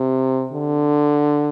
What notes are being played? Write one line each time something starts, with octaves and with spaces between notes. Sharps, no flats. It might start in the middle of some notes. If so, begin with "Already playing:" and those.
Already playing: C3
D3